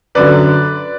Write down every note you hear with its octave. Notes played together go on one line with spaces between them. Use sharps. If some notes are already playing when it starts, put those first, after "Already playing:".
F#2 D3 F#3 B4 D5